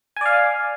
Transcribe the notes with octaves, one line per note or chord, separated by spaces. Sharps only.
D5 F5 G#5